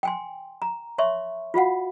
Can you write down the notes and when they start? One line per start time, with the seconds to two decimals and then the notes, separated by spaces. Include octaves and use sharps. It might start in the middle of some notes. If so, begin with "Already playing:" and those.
0.03 G5 G#5 C6
0.62 A#5
0.98 C#5 E5 C6 C#6
1.54 F4 F#4 F5 F#5